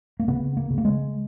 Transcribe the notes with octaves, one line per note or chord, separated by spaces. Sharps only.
A#3
C#3 B3
A#3
C#3
A#3
G#3